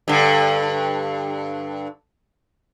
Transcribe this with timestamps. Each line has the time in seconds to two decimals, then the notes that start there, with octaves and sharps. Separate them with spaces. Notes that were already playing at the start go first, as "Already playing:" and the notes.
0.08 G2 D3